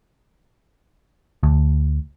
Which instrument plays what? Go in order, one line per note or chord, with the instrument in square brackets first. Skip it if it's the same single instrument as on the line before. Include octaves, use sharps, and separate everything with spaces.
[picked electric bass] D2